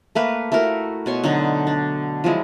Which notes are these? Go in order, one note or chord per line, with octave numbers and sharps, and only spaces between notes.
A3 A#3 B4
A3 E4 F#4 A#4
B2 C#5 C6
D3 F#3 D#4
D4
F3 F#3 G#3 E4